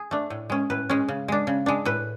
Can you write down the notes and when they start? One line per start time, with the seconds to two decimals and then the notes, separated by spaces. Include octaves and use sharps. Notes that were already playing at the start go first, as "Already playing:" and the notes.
Already playing: G#4
0.11 A3 D4
0.30 A2
0.50 G#3 C#4
0.70 A2 B4
0.90 G#3 C#4
1.08 C#3
1.28 G#3 D4
1.47 C#3
1.66 G#3 D4
1.85 A2 B4